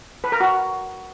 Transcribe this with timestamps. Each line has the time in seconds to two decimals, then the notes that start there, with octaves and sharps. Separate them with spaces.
0.24 B4
0.32 A#4
0.40 F#4